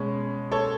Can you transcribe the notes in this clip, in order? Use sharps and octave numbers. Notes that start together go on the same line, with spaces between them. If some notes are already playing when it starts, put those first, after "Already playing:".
Already playing: B2 G#3 C#4
A4 C#5